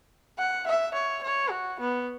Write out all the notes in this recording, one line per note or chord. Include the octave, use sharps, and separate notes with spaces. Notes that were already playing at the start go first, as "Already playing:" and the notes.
F#5
E5
C#5
C#5
F#4
B3